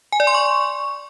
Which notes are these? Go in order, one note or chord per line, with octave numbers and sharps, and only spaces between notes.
G#5
D5
C6
C#6